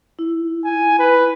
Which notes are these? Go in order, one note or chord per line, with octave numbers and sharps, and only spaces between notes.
E4
G#5
B4